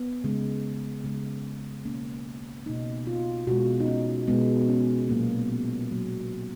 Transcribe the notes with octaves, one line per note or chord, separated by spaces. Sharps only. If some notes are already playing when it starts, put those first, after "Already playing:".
Already playing: B3
C#3 G#3
C#3 G#3
B2 A#3 C#4
B2 A#3 D#4
F4
B2 G#3 F#4
D#4
C#4
B2 G#3 B3
C#4
A#2 F#3 A#3
A#2 F#3 A#3